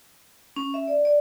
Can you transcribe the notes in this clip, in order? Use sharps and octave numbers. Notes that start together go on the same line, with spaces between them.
C#4
E5
D5
D5